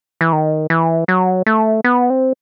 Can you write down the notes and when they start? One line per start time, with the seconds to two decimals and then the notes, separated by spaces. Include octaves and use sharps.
0.21 E3
0.33 D#3
0.70 E3
1.08 F#3
1.46 A3
1.84 B3
2.10 C4